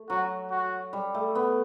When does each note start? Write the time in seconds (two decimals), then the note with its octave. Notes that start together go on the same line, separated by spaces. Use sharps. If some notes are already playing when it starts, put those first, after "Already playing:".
Already playing: A3
0.10 F#3 F#4
0.51 F#4
0.93 G3
1.15 A3
1.35 B3